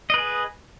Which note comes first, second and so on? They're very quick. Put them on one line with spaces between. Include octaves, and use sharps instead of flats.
D#5 B4 G#4